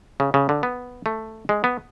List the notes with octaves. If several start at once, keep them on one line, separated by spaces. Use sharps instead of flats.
C#3
C#3
D3
B3
A3
G#3
B3